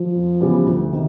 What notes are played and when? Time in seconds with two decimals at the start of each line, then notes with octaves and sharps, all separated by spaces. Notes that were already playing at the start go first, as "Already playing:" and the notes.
Already playing: F3
0.15 F2
0.41 C#3 E3 G3 B3
0.66 D2
0.92 C3 D#3